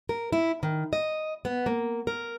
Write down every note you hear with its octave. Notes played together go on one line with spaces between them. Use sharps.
A#4
E4
D#3
D#5
B3
A#3
A#4